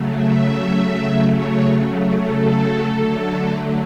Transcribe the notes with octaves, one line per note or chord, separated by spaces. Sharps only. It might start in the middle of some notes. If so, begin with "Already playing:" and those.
Already playing: C#3 F#3 A3
E5
C#5
A4
D3 F#3 A3